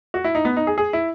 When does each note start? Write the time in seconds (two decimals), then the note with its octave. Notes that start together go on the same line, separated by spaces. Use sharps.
0.14 F#4
0.24 E4
0.35 D#4
0.45 B3
0.57 D#4
0.67 G#4
0.78 G#4
0.93 E4